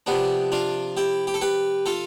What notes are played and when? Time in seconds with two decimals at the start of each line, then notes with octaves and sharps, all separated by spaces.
0.06 C3 F3 B3 D4
0.52 D4 F4
0.97 E4 G4
1.27 G4
1.34 A4
1.41 G4 B4
1.86 F4 A4